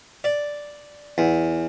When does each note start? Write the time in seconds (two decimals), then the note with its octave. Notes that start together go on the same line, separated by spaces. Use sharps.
0.24 D5
1.18 E2